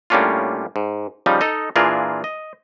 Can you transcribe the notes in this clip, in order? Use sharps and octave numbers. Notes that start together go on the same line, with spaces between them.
A2 G3 A#3 C#4 D4 F4
G#2
C#3 F3 G3 D#4
D#4 A4 D#5
A#2 E3 D4 F4 G#4 A#4
D#5